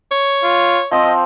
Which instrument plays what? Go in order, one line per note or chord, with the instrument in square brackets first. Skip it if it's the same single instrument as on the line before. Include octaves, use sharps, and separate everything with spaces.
[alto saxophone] C#5
[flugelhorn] F4
[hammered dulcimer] F3 C4 [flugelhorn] D#5